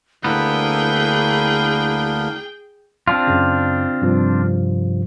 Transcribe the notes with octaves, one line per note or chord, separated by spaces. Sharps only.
D2 A#3 B3 D4 E4 G#4 A#4 G5
C4 D4 F4
F#2 C#3
G2 C3 F3